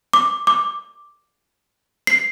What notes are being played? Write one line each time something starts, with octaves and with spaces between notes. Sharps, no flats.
D6
D6
C7